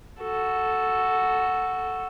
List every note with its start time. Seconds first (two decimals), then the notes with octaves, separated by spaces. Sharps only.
0.20 F#4 A4